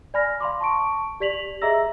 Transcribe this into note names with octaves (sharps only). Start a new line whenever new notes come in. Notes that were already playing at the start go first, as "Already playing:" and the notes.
D5 G#5 B5 F6 A#6
F5 B5 C6 D6
A5 C#6 D7
G4 D5 B6 F7 F#7
G#4 D#5 E5 A#5 E6 A#6